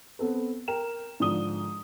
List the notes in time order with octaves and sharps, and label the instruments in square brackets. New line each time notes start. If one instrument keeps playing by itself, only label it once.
[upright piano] B3 C4 A4 B4
A#4 G5 E7
G#2 D3 F3 D5 D#6 G7